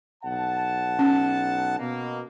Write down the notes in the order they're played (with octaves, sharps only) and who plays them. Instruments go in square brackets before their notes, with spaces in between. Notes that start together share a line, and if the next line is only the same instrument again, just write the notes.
[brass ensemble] B1 F#5 A5
[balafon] C#4
[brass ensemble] B2 A#3